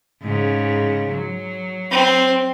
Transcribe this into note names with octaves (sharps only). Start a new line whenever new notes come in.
G#2 C#3
F#3
C4